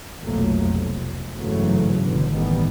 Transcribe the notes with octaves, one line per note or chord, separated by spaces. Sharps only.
F1 B1 F2 F#3 A3 A#3
F1
G1 G#2 C#3 E3 F#3 A3
G1 B2 D3
A2 D#3 E3 G3 B3